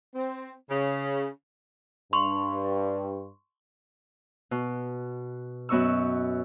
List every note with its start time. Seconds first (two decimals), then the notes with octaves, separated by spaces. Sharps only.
0.15 C4
0.70 C#3
2.13 G2 C6 C#6
4.51 B2
5.69 F#2 B3 D#5 C#6 E6